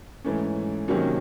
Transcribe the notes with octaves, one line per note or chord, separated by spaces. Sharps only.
G#2 E3 A3 C#4
C3 D#3 F#3 A#3 C#4